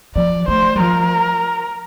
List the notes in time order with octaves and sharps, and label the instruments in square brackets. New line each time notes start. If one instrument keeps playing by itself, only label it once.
[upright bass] F3 [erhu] D5
[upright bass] A3 [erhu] C5
[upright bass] G3
[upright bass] F3 [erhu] A#4